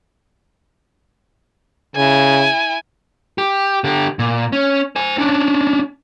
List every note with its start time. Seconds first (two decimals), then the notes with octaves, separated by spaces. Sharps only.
1.96 C#3 E4 G#5
3.38 G4
3.84 D3 G4
4.19 A#2
4.52 C#4
4.96 C5 G#5
5.18 C#4 D4